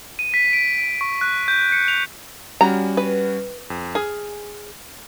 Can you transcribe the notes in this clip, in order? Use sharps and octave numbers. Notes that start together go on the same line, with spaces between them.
D#7
B6
D7
D7
C#6
F#6
G6
C#7
F7
G3 C#4 F#4 A#5
B4
F2
G#4 F6